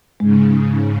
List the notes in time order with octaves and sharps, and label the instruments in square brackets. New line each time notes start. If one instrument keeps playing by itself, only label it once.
[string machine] G#2 C#3 [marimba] G#3